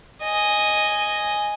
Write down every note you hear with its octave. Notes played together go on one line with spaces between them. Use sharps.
D#5 G#5